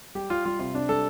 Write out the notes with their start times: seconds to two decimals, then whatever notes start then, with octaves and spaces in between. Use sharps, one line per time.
0.15 G3 G4
0.30 G3 F4
0.45 G3 F4
0.59 C3 F4
0.74 C3 D4
0.89 G3 A4